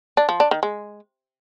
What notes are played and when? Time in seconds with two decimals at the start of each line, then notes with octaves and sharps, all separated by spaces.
0.17 D4
0.29 F3
0.40 D4
0.51 D#3
0.63 G#3